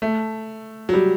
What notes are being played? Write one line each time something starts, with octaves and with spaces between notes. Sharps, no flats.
A3
F#3
G3